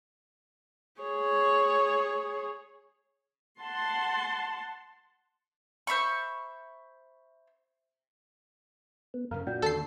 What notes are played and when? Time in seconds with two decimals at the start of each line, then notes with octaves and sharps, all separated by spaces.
1.01 G#4 C#5
3.61 F#5 A5 C6
5.87 C5 E5 B5 C#6
9.14 B3
9.31 F#2 C#3 A#4 F5
9.47 A#2 D4 F#4 G5
9.62 D#2 D3 A4 C7